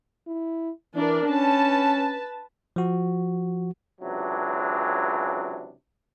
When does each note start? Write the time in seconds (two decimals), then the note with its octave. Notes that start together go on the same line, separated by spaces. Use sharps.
0.27 E4
0.94 E3 D4 A#4 D5
1.29 C#4 B4 A5
2.76 F3 F#4
4.01 C#2 C3 E3 F#3 D4